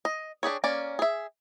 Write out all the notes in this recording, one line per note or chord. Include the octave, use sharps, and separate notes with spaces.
D#5
D4 G4 G#4 C#5
A#3 C#4 D5
G#4 E5